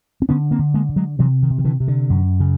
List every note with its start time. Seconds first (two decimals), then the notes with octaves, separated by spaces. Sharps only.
0.22 C4
0.29 D3 B3 C#4
0.51 A#3 C4
0.59 D3
0.74 G#3 A#3
0.89 D3
0.96 F#3 G#3
1.19 C3 E3 F#3
1.43 D#3
1.50 C3
1.58 D#3
1.64 D3 E3
1.80 C3
1.88 D3
2.10 F#2
2.40 C#3